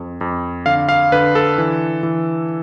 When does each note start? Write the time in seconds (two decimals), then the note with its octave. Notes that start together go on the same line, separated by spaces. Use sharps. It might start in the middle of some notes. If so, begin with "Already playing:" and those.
Already playing: F2
0.21 F2
0.66 D3 F5
0.89 F5
1.12 D3 B4
1.35 A4
1.58 E3
2.03 E3